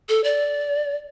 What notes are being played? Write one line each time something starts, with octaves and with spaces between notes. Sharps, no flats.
A4
D5